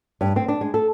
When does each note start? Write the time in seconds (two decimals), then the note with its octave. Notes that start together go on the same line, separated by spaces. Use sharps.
0.21 G2
0.36 C4
0.48 D4
0.61 G#3
0.74 A4